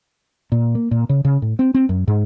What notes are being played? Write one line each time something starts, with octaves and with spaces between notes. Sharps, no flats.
A#2
A#3
A#2
C#3
C#3
A2
C4
C4
F#2
G#2